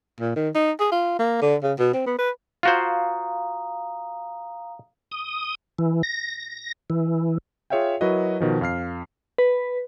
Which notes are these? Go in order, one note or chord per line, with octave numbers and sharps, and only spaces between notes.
A#2
D#3
D#4
G#4
F4
A#3
D3
C#3
B2
C4
B3
B4
F4 F#4 C5 F5 A#5 D#6
D#6
E3
A#6
E3
F4 G#4 C#5 E5 F5 G5
F#3 E4 F#4 A#4 B4 D#5
B2 D#3 F3
F2 F5 F6 C7
B4